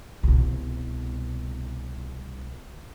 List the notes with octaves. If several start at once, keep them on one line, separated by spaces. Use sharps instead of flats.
C2 B2